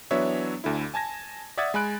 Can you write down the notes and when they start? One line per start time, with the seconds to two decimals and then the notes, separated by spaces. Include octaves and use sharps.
0.11 E3 F#3 B3 D4 C#5 E5
0.64 D2 D3 E4
0.94 G#5 A5 G#6 A#6
1.57 D5 E5 F#5 D#6 G#6 A6
1.74 G#3 G#5 B5 F#6 D7